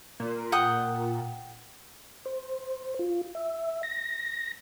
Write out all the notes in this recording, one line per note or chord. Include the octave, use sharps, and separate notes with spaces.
A#2
F#5 G5 D#6
C5
F4
E5
A#6